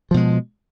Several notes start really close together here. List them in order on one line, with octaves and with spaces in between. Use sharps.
F3 B2 G#3